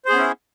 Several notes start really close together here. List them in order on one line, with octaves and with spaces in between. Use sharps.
C5 G#4 B3 C#4 E4